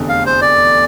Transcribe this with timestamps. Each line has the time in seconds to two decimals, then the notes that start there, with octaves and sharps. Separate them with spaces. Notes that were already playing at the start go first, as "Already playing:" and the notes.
Already playing: F1 E2 D3 A3
0.09 F5
0.26 C5
0.41 D5